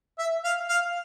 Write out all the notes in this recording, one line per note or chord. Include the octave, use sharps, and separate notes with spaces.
E5
F5
F5